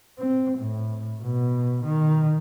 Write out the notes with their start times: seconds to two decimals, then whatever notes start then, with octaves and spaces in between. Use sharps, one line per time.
0.19 C4
0.59 A2
1.22 B2
1.85 D#3